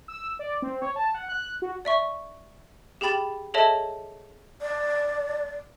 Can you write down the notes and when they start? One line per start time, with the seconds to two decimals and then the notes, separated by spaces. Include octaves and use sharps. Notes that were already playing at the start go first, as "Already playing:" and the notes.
0.08 E6
0.39 D5
0.62 C4
0.82 C#5
0.96 A5
1.14 F#5
1.29 F#6
1.62 F#4
1.85 D5 E5 C#6
3.01 G4 G#4 G5 B5 A6 F#7
3.54 G#4 A4 C#5 D#5 E5 A5
4.61 D5